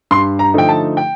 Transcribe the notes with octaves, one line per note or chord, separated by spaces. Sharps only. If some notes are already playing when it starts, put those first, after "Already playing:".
G2 C6
A#5
D3 F3 A3 D#4 G5
A5
G5